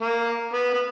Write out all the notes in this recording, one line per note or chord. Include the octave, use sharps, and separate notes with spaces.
A#3
B3
B3